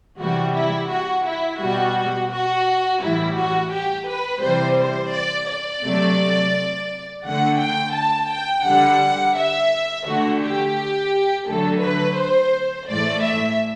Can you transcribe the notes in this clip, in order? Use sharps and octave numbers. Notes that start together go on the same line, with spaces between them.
C3 E3 G3 F#4
E4
F#4
E4
B2 G3 F#4
F#4
A2 E3 G3 E4
F#4
G4
B4
C3 E3 G3 C5
C5
D5
D5
C3 F#3 A3
D3 A3 F#5
G5
A5
G5
D3 G3 F#5
E5
D3 A3 F#4
G4
D3 F#3 A3 A4
B4
C5
A2 E3 A3 D5
E5